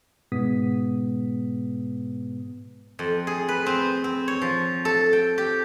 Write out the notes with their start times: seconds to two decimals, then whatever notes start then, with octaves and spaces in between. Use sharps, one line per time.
0.32 G#2 B2 G#3 B3 D#6 B6
2.99 F2
3.27 G#4
3.49 B4
3.66 C4
4.04 C4
4.28 C#5
4.42 F3
4.85 A4
5.13 G5
5.38 G4